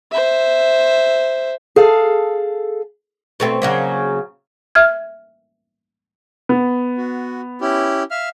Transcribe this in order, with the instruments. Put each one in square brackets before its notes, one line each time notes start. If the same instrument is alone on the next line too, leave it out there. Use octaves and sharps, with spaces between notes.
[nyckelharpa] C5 E5
[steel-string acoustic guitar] G#4 A4 F5
[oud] B2 A3 C4
C#3 F#3 A#3
[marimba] E5 F6 G#6
[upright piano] B3
[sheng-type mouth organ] F#4
C#4 E4 G4
E5 F5 F6